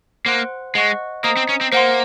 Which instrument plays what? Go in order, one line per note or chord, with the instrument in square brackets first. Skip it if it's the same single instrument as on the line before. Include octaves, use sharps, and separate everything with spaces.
[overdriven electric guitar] A#3 [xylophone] C5 F#5 C6 F#6
[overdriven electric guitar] G#3 [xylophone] D#5 F#5 C#6 F#6
[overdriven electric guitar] A#3 [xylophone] C5 D#5 A#5 D#6
[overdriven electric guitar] C4
C#4
C4
[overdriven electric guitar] A#3 [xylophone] C5 F#5 C6